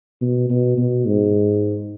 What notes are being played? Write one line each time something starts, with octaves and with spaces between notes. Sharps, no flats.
B2
B2
B2
G#2